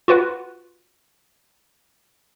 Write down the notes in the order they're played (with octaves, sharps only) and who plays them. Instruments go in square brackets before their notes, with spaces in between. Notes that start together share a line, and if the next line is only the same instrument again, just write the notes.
[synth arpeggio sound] F4 F#4 B4 F#5